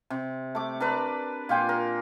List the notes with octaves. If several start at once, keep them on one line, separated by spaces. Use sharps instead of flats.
C3
A3 D6
D4 A#4 B4 D5
A#2 F4 G5 G#5
A#4